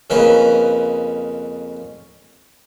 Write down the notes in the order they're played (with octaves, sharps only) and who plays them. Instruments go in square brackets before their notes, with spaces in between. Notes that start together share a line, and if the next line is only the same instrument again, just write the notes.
[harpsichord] F2 C#3 A#3 D#4 B4